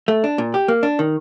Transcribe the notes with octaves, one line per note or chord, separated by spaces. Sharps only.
A3
D4
A#2
G4
A#3
D4
D#3